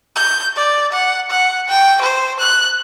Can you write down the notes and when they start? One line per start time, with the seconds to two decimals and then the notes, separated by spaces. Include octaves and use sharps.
0.16 G6
0.56 D5
0.92 F#5
1.30 F#5
1.68 G5
2.02 C5
2.40 F#6